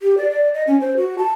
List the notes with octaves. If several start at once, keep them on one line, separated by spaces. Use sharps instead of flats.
G4
D5
D5
D#5
C#4
C5
F#4
A5